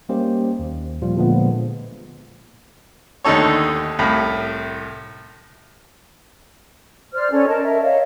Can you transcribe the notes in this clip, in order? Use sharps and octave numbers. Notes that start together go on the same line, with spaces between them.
G3 A#3 C#4 G4 C5 D#5
D#2
A#2 F3 G3 F4
A#2 D3 F3 G#3 A3 B3
D#2 D3 A3 D#4 A4 C#5
C2 A2 B5
C5 D5 F6
C#4 A4 D5
A#4 D#5 A5
A#4 E5
C#5 D#5 F5